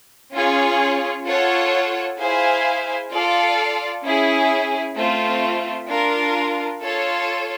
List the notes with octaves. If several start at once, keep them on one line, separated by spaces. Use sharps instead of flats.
C#4 F4 G#4 C#5
F4 A4 C#5 F#5
E4 G#4 C5 F5 G#5
F4 A4 D5 F5
C#4 E4 G#4
A3 C4 F4
D4 F4 A#4
F4 A4 C#5